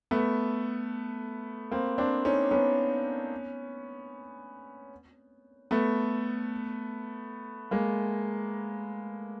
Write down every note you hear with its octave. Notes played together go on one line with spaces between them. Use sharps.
A3 B3
A#3 C4
C4 D4
C#4 D#4
B3 C#4
A3 B3
G#3 A#3